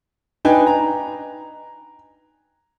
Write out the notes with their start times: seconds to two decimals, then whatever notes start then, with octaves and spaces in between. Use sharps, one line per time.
0.45 D4 D#4 B4 G5 G#5
0.67 A#5